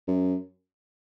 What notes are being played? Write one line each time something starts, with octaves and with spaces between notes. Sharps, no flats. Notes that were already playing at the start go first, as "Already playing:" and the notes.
F#2